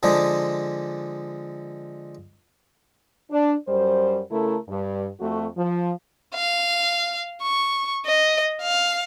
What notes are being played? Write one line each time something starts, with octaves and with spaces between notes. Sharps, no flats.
D3 F3 G#3 D4 D#4
D4
F#2 G3 C5
C#3 A3 E4 A4 A#4
G2
F2 A3 F#4
F3
F5
C#6
D#5
F5